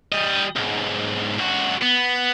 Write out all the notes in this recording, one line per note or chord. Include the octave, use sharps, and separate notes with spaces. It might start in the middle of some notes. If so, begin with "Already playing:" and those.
G3 D#5
B1 G#2
C#2 F#4
B3